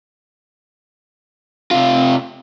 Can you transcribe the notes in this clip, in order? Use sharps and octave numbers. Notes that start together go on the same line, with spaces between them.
C3 F4